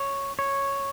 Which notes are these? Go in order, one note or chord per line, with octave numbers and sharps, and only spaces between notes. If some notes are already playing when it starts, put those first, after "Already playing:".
Already playing: C#5
C#5